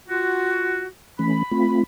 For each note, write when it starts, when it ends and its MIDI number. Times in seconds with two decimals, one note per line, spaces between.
0.09 0.86 65
0.09 0.86 66
1.19 1.43 52
1.19 1.43 57
1.19 1.43 61
1.19 1.80 83
1.51 1.83 57
1.51 1.83 60
1.51 1.83 65